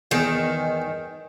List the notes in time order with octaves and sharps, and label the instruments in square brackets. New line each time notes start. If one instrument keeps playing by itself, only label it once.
[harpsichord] E2 G#3 [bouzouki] D#3